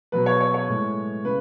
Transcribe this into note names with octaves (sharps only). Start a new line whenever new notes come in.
B2 F#3 B4
C#5
C#5
C#5
A2 G#3
C#3 B4